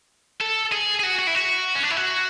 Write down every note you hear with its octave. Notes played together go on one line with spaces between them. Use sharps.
A4
G#4
G#4
F#4
F#4
E4
F#4
C#4
D4
E4
F#4